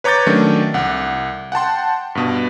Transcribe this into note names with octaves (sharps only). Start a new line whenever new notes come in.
B4 C#5 A#5 D6 G6 A6
D#3 F#3 A3 C#4 D4
C2 F#5
F#5 G5 A5 C6
G2 B2